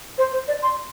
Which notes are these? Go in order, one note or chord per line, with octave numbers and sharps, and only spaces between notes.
C5
C5
D5
C6